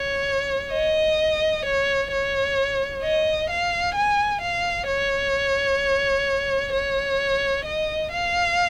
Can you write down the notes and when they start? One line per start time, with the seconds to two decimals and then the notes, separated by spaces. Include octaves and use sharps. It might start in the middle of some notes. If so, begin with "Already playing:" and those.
Already playing: C#5
0.72 D#5
1.65 C#5
2.12 C#5
3.03 D#5
3.50 F5
3.95 G#5
4.41 F5
4.88 C#5
6.73 C#5
7.65 D#5
8.12 F5